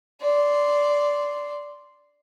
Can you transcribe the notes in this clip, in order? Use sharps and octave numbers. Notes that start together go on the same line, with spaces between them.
D5 C6